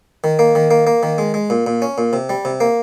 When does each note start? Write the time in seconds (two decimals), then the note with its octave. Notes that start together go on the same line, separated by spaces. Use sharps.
0.24 D#3
0.39 A#3
0.55 D#3
0.71 A#3
0.87 A#3
1.03 D#3
1.18 G#3
1.34 G#3
1.50 A#2
1.66 A#2
1.82 C#4
1.98 A#2
2.13 C3
2.29 G3
2.45 C3
2.60 A#3